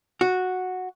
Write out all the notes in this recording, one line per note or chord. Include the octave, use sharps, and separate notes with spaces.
F#4